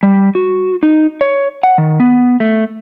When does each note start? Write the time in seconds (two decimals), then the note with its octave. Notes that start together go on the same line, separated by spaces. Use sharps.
0.03 G3
0.35 F#4
0.83 D#4
1.21 C#5
1.63 F#5
1.78 D#3
2.00 B3
2.40 A3